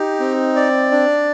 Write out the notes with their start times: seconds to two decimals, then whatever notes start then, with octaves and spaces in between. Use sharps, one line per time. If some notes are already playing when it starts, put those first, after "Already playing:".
Already playing: D#4 G4
0.20 C4
0.56 D5
0.91 D4